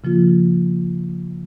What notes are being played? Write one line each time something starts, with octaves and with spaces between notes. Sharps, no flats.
C#3 F3 A#3 F4